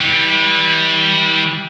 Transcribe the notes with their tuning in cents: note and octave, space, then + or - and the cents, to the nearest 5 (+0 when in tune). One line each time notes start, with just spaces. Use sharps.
E3 -30 G3 +0